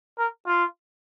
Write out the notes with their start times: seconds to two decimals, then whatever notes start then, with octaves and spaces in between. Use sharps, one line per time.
0.18 A#4
0.47 F4